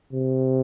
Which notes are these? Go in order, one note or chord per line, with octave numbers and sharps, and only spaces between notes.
C3